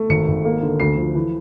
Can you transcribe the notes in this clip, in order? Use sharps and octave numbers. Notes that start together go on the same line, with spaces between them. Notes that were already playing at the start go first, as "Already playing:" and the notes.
Already playing: A3
G#1 C#7
G#1
A#3
D3
D2 C7
F3
E3